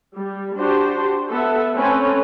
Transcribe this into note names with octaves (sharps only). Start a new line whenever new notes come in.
G3
D4 F#4 G4 C5
B3 A4 E5 F#5
A3 C4 C#4 A4 B4